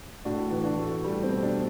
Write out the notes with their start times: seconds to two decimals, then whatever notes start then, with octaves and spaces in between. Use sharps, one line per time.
0.25 A2 D4 F#4
0.51 E3
0.64 D4 F#4
0.78 A3
1.04 G3
1.23 C4
1.29 B2
1.43 D4